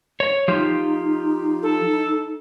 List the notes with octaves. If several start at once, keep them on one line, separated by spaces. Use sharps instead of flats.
C#5
F3 D#4 F4 G4
A4